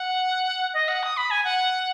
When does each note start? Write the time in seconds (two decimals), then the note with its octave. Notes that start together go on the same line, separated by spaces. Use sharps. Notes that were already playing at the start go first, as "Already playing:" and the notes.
Already playing: F#5
0.74 D#5
0.88 F#5
1.03 D#6
1.17 B5
1.31 G#5
1.44 F#5